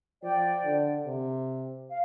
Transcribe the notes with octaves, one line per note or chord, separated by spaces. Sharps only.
F3 D5 G5
D3
C3
F5